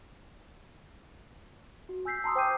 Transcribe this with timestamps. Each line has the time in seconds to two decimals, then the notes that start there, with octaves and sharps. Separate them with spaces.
1.89 F#4
2.05 G#5 E6 G6 B6 C7
2.24 A5 A#5 C6 D#6 E6
2.35 C5 G5 D6 D#6 G6 D#7